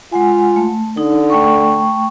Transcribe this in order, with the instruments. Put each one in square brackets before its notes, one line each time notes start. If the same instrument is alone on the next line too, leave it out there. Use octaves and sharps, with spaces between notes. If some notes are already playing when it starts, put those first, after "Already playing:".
[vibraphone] G#3 F#5 G#5 [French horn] F4
[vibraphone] A3
[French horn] D3 [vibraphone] D#4
[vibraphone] A3 G5 C#6